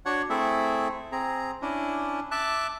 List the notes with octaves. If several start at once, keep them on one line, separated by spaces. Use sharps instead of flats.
D4 F#4 C#5 F#5
A3 C4 E4 G#4 A4 E5
C4 G#4 A#5
C#4 D4 E4
E5 A5 D6 F#6